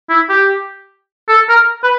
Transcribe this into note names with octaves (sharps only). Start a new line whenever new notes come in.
E4
G4
A4
A#4
B4